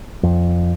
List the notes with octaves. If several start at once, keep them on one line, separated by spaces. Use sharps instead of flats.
F2